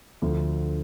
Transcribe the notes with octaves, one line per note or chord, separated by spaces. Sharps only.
D2 D3 F3